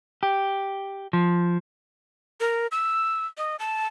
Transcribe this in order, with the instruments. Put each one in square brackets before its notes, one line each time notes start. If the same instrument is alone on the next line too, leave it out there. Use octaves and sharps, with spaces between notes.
[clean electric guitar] G4
F3
[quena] A#4
E6
D#5
A5